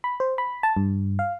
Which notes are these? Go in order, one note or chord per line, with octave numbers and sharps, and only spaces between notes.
B5
C5
B5
A5
G2
F5